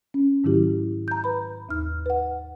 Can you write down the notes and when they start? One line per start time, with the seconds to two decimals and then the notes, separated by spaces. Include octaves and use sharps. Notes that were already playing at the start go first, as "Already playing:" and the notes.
0.14 C#4
0.44 G#2 D#3 F#3 E4 G4
1.08 A#5 G6
1.24 B4 B5
1.69 D#2 D#4 F6
2.06 B4 F#5